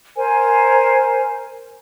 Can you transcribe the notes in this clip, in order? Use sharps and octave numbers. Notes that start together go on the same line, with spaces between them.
A#4 C5 G#5